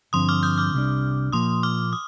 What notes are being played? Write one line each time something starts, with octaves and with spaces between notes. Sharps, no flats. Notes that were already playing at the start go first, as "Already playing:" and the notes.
G2 D3 F3 C4 C6 D#6
D6 F6
D#6 G6
D6 F6
C2 C3 G3 D4
A#2 F3 A#3 C6 D#6
D6 F6
D#6